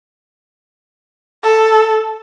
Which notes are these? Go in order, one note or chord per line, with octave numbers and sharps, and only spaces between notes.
A4